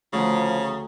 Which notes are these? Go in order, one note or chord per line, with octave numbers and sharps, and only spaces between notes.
D2 C#3 F3 A#5